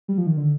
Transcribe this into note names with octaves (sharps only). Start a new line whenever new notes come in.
G3
F3
D#3
D3